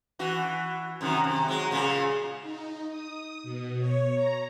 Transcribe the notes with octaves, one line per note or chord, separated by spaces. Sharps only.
E3 F#4
F#2 C3 D#3
C3
F#3 G#3
A#2 C#3 G#3
D#4
D#6
B2
C#5
A#5